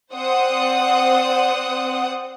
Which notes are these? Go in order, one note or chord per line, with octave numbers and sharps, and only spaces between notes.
C4 C5 D5 F#5 D#6